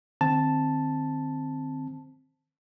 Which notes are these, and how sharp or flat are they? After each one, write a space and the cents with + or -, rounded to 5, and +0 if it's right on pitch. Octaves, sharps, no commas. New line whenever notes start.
D#3 -40 C4 +0 A5 +0